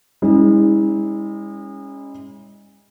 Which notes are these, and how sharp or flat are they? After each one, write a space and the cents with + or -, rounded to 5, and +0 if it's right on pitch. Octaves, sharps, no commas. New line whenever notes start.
G#3 -35 C#4 +0 E4 -40